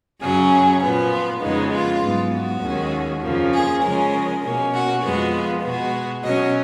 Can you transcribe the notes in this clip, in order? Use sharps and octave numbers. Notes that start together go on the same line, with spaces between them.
F#2 C#3 F#3 C#4 G#4
A#2 F3 B3
F4
F2 C#3 G#3 B3 D#4
F4
G#2 F#3 B3
F#4
D#2 D#3 G#3 C#4
F2 C#3 F3 A#3
G#4
C#3 F3 G#3 C#4 A#4
B2 A#3 C#4
F#4
F2 F3 G#3 B3 F#4
F4
B2 G#3 B3 F#4
B2 F#3 C#4 D#5